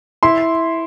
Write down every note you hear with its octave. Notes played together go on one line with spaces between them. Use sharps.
E4 C6